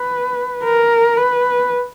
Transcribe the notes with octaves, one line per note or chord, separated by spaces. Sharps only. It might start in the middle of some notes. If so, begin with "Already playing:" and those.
Already playing: B4
A#4
B4